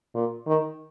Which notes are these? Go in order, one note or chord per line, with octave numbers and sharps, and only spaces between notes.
A#2
D#3